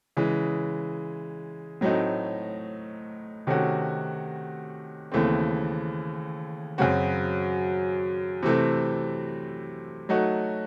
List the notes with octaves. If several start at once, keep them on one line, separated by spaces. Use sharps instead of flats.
C#3 E3 G#3
A2 F#3 A3 C4 D#4
C3 D#3 A3 C#4 F#4
D#2 C#3 E3 A3 C4
F#2 C#3 F#3 C4 F#4
C3 E3 A3 C4
F#3 A3 D#4 F#4